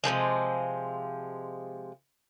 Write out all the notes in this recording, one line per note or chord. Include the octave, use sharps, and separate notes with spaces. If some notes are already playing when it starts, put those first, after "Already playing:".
C3 D#3 F3 G#3